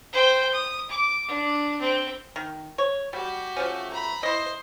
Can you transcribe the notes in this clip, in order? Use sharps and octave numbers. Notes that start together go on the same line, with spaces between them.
C5 G5
D#6
D6
D4
C4
D#3
C#5
G3 F#4 G4
F3 A3 C#4
A#5 B5
E4 C5 D#5